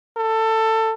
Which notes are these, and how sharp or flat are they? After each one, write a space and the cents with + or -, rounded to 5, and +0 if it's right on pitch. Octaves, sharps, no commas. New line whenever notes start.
A4 +20